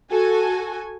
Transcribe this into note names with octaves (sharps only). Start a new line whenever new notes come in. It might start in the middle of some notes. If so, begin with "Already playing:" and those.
F#4 A4 G#5